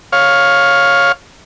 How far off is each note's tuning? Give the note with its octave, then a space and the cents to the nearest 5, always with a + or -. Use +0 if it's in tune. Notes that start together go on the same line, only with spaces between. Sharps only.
C#5 +0 F5 +10